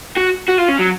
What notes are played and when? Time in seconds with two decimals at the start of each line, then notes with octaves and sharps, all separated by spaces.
0.16 F#4
0.48 F#4
0.58 F4
0.68 C#4
0.78 F#3